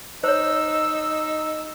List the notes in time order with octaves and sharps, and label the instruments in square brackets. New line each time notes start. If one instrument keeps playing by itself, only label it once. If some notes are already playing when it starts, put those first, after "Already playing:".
[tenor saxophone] D#4 [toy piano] C5 C#5 [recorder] E6